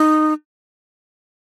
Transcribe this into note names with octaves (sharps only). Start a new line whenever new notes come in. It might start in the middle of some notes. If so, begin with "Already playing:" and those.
Already playing: D#4